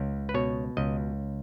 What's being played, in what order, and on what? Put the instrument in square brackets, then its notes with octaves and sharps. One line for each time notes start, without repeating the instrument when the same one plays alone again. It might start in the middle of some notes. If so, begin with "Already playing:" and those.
Already playing: [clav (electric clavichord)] C#2
B4
B2 C#5
C#2 D#5